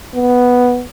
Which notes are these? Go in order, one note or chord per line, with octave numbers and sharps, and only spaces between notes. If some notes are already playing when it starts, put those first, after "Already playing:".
B3